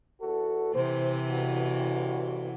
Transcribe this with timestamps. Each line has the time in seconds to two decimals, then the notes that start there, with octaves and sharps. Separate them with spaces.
0.21 E2 F#4 A4
0.75 C3 E3 C5
1.31 A1 G2 F#4